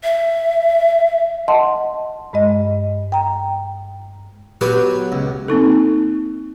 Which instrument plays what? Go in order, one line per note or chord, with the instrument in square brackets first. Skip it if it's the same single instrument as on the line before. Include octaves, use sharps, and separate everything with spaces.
[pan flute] E5
[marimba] D#5 F#5 A5 C6
G2 G#3 D#5
G5 A#5
[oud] F#3 B3 G4 [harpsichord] B4 G#5
[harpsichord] C#2
[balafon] A#3 C4 D#4 A4